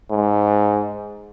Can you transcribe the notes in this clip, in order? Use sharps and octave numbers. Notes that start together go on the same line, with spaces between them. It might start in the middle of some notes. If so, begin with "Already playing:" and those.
G#2